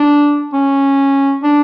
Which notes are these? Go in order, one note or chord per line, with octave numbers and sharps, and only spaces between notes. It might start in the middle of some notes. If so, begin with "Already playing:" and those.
Already playing: D4
C#4
D4